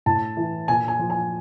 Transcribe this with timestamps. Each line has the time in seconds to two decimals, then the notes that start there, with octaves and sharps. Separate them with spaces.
0.06 A2 A5
0.37 E3
0.68 A#2 G#5
0.88 G#5
0.99 F3
1.10 G#5